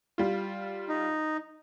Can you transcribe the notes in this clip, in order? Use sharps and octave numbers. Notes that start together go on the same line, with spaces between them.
G3 F4
D#4